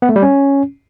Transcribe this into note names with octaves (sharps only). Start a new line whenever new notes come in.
B3
A3
G3
C#4